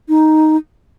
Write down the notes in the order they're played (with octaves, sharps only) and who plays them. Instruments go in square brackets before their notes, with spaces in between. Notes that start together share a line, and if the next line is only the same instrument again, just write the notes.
[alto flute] D#4